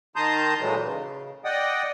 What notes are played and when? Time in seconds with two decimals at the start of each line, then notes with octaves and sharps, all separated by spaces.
0.16 D#3 A5 A#5 C6 D#6 G6
0.60 A#2 E3 F#3 G#3 A3 B3
0.83 C#3
1.45 D5 D#5 F#5 G5 D#6